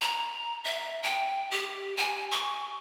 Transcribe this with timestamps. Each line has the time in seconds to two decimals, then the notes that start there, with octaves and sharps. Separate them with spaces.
0.01 A#5
0.64 E5
1.03 G5
1.51 G4
1.97 G#5
2.31 C#6